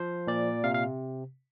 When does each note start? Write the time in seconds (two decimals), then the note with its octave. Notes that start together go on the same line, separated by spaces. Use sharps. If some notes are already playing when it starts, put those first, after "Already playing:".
Already playing: F3 C5
0.27 A#2 D5
0.64 C3 F5
0.74 F5